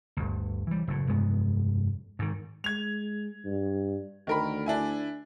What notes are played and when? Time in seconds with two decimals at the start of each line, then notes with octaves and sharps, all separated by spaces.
0.17 G1 D2
0.67 E3 G3
0.88 F#1 A2
1.07 F1 G2 G#3 B3
2.19 G#2 D#3
2.64 G#3 G#6 F7
3.45 G2
4.27 D2 D#3 A#4 B5
4.66 D4 E4 G#5